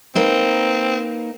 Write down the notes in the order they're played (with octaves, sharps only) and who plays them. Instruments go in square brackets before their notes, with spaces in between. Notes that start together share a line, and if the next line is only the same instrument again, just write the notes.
[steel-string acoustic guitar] A#3 D#4 B4 [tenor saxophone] C4